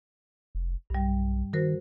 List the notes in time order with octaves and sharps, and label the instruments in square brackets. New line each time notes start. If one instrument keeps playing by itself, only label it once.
[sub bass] F1
[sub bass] B1 [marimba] G2 G3
[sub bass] D#3 [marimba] F#4 A#4 C5